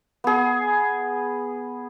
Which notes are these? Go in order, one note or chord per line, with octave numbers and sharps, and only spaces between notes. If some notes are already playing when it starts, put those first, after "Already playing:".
B3 G#4